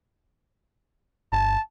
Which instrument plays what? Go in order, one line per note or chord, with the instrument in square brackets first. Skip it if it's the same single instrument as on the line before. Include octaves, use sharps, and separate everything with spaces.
[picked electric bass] G1 [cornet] A5